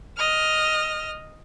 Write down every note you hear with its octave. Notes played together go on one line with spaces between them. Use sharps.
D#5 F6